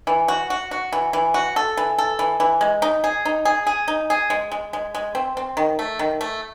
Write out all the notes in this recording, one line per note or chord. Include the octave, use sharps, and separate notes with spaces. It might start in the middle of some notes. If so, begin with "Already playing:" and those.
E3
F#4
F#4
F#4
E3
E3
F#4
A4
E3
A4
E3
E3
G#3
D#4
G#4
D#4
G#4
G#4
D#4
G#4
G#3
G#3
G#3
G#3
C4
C4
D#3
A3
D#3
A3